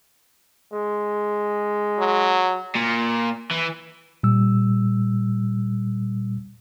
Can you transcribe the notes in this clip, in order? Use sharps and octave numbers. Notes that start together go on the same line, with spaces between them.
G#3
F#3
A#2
E3
A#2 G3 E6